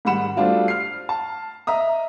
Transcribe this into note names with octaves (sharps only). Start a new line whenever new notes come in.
G#2 D#3 G3 F#5 B5 E7
G3 A3 C4 D4 F4 F#4
F6 C7
A5
D#5 E5 A#5 D#6